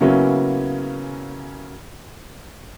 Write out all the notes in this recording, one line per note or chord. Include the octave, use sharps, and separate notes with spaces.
C#3 F#3 A#3 B3 C#4 E4